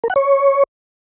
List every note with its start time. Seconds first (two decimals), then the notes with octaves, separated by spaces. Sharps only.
0.04 A#4
0.10 F#5
0.16 C#5